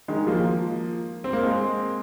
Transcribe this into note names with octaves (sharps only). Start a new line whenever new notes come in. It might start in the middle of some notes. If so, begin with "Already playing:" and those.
D#3 G#3
F3 A#3
C4
A#3
G#3 C4